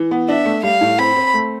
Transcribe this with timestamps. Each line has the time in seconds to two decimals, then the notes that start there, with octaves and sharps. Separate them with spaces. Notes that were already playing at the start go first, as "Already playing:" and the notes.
Already playing: E3
0.11 B3
0.28 D4 E5
0.45 A3
0.63 G3 F5
0.81 A2
0.99 C4 B5
1.16 C4
1.34 A3